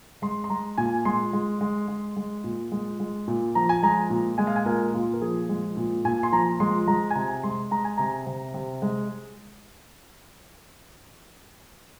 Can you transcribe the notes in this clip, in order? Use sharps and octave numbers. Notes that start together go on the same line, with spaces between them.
G#3 C6
C6
G#3 A#5
A#2 G#5
G#3 C6
G#3
G#3
G#3
G#3
A#2
G#3
G#3
A#2
F3 A#5
G#5
G#3 A#5
A#2
G#3 G#5
F5
G#5
A#2 A#4
A#2 F4
A#4
F3 G#4
G#3
A#2
A#2 G#5
C6
F3 A#5
G#3 C6
G#3 A#5
G#5
C3 A#5
G#3 C6
G#3 A#5
G#5
C3 A#5
C3
C3
G#3